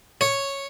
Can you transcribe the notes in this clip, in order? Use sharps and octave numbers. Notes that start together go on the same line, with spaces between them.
C#5